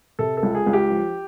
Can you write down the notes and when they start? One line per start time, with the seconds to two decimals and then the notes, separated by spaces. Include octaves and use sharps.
0.19 C3 A4
0.37 A4
0.43 C#2
0.55 G#4
0.67 C#2
0.73 G4
0.90 F3